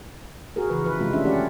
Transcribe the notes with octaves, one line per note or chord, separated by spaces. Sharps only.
F#4 G#4 A#4
C#3 E3 A#4 B4
F3 B4
C3 D#3 F3 G#3 C4 F4
A3 C#4 D4 E5
A#3 C#4 E4 G4 D5 F#5